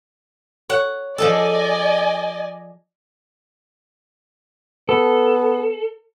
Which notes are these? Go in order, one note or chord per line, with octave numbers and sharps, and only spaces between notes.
C#5 F#5
F3 G#4 A4 D5 D#5 G#5
B3 A4